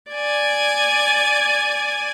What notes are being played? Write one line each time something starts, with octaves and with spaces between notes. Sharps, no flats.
D5 G#5